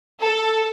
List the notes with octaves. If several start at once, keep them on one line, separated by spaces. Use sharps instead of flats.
A4